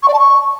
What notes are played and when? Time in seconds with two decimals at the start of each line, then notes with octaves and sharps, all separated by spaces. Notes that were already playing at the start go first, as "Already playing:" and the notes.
0.02 C#6
0.08 D5
0.13 A5
0.18 C#6